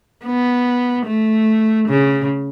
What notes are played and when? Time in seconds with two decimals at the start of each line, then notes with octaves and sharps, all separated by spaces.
0.25 B3
1.06 A3
1.88 C#3